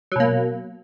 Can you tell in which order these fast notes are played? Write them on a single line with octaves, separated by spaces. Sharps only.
F#3 B2 A#3